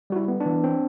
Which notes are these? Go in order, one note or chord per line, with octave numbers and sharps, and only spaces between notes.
G3 F#4
E4
B3
D4
E3
C4